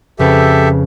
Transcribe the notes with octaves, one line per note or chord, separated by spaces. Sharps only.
F2 C#3 G4 A4 B4 E5